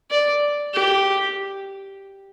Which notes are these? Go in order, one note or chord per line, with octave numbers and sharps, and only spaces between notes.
D5
G4